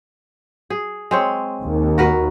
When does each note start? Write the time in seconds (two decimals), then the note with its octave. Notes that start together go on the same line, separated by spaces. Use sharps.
0.70 G#4
1.11 G#3 C4 C#5
1.61 D#2
1.98 F#4 A#4 B4